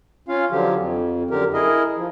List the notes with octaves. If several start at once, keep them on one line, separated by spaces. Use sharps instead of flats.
C#4 F4 F5
D3 F3 F#3 G4
F2
F#2 D3 G4 A#4
E4 G#4 A#4 D#5
F3